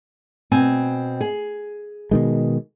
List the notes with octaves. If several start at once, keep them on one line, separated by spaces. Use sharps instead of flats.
B2 C4 G#5
G#4
B2 D#3 G#3